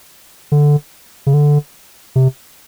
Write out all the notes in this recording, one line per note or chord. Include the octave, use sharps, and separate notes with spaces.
D3
C#3
D3
C3